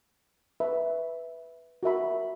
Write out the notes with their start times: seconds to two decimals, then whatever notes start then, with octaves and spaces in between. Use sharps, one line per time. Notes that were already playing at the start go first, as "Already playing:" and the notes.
0.60 B4 E5 B5
1.83 F#4 A#4 E5 B5